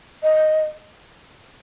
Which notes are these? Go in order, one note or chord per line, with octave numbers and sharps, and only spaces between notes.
D#5